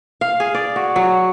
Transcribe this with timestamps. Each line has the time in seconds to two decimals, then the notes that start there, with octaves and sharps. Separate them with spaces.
0.21 F5
0.40 G#4
0.54 D5
0.76 F#4
0.96 F#3